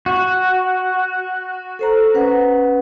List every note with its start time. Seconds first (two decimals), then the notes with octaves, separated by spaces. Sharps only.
0.06 F#4
1.79 A4 C5 A#5
2.14 C#4 B4 F#5